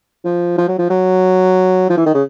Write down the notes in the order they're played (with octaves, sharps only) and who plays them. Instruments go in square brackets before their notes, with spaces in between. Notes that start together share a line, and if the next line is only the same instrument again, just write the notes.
[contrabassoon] F3
F3
F#3
F3
F#3
F3
E3
D#3
C#3